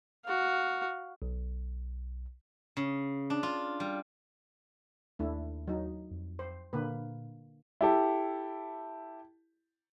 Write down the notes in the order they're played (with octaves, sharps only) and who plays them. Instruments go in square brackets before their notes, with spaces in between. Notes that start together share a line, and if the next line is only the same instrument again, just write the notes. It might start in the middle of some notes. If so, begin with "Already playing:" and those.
[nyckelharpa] F#4 F5
[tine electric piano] B1
[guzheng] C#3
D4
F4
G3
[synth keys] D#2 [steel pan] A3 D4 E4
[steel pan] F#3 D#4
[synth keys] F2
[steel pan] C5
[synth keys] A#2 [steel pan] D3 A#3 B4
[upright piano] E4 G4 A4